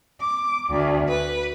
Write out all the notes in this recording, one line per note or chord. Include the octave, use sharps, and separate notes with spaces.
D6
D2
B4